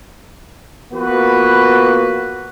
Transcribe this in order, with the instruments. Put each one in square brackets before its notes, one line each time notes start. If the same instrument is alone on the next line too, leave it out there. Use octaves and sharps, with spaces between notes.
[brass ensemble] F3 A#3 B3 F#4 B4